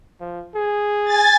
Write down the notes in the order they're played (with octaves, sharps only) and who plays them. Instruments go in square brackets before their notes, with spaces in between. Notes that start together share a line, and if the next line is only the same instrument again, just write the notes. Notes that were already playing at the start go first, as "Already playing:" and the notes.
[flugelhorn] F3
G#4
[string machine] G#5 A6